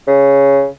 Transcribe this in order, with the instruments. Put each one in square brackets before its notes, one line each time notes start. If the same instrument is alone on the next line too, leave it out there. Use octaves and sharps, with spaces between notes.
[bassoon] C#3